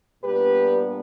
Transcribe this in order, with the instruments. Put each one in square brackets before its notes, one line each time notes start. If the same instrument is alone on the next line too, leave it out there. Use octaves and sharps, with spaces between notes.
[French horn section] A#2 G3 B3 D4 G4 B4